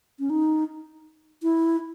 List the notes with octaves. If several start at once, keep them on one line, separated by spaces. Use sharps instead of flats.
C#4
D#4
E4